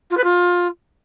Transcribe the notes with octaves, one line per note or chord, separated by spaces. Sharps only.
F4
B4
F4